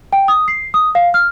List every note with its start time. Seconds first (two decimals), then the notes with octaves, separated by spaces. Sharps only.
0.13 G5
0.28 D#6
0.48 C7
0.74 D#6
0.95 F5
1.14 F6